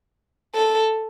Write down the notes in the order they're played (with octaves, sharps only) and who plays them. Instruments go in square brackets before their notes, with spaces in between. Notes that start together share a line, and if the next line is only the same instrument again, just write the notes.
[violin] A4